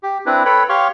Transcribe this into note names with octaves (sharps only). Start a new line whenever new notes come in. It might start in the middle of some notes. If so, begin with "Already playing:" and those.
G4
C4 D4 E4 B4
A4 B4 C#5 G5 B5
G4 C#5 F5 C6 C#6